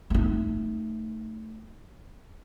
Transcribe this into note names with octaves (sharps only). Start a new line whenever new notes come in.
A3 D#4